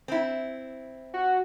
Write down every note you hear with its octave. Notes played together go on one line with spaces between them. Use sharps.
C4 E4
F#4